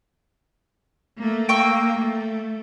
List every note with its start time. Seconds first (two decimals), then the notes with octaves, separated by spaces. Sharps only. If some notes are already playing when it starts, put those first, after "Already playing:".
1.18 A3 A#3
1.49 A#3 G5 C#6 E6
1.98 A3